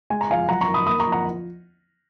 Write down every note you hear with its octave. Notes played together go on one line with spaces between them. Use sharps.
G#3 G#5
A#5
F3 F5 G#5
F#3 F#5 A#5
A#5 C#6
D#3
B5 D#6
A#3 B5 D#6
A#5 C#6
F3
F#5 A#5